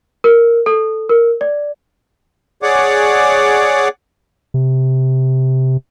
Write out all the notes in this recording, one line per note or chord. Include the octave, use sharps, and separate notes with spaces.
A#4
A4
A#4
D5
G#4 C#5 D5 F#5 D6
C3